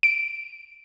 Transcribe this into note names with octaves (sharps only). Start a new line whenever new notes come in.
D7